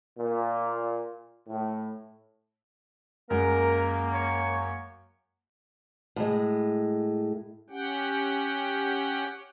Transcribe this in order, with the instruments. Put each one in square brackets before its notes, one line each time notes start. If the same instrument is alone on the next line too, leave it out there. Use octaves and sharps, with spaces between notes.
[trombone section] A#2
A2
[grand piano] F#2 G#3 [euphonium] A#3 [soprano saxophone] A#4
[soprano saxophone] C#5
[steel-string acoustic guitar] A2 G#3
[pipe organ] C#4 G4 F#5 G5